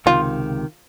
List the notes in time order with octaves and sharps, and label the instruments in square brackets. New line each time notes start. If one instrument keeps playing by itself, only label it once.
[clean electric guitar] C#2 C3 D#3 [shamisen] F4